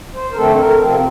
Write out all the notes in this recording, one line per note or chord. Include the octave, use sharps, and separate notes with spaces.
C5
A#4
F2 D3 A3 C4 A4
A#4
C3 F3 C4